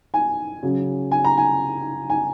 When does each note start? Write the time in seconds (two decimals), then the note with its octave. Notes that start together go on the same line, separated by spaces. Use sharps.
0.14 G#5
0.63 C#3 F#3
1.12 G#5
1.24 A#5
1.38 G#5
2.10 G#5